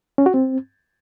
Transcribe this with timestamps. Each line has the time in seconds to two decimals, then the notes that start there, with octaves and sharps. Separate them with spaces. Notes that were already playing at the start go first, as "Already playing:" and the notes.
0.18 C#4
0.26 F#4
0.34 C4